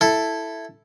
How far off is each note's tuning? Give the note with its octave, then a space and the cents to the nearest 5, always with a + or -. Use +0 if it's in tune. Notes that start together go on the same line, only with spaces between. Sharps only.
E4 +0 A4 +0